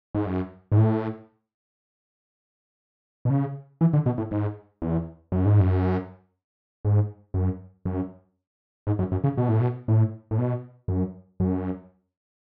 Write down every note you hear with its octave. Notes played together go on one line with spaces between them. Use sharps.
G#2
F#2
G#2
A2
B2
C#3
E3
D3
B2
A2
G#2
E2
F#2
G#2
F#2
G#2
F#2
F#2
G#2
F#2
F#2
C#3
B2
A2
B2
A2
A2
B2
F#2
F#2